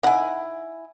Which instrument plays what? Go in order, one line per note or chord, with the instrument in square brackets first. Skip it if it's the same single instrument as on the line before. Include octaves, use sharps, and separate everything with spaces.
[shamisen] D#4 F#5 [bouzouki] E4 G#5